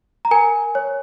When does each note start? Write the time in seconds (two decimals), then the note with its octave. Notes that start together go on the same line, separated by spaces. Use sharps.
0.25 A#5
0.31 A#4 G#5
0.75 C#5